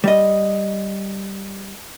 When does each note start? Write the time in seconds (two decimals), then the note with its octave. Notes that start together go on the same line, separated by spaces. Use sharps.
0.04 G3 D#5